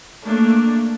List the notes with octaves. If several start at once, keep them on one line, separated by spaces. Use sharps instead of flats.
A3 A#3 D4